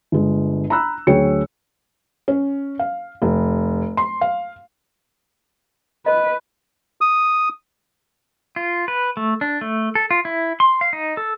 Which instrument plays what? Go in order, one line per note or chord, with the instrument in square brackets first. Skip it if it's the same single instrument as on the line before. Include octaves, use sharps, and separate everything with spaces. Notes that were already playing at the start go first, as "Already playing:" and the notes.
[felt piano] G1 G#3
A#5 B5 E6 F#6
D2 F#3 G#4 C#5 G5 C#7
C#4
F5
F1
C6
F5
[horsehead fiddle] B4 [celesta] D#5
[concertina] D#6
[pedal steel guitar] F4
B4
A3
D4
A3
A4
F4
E4
C6
F5
D#4
A4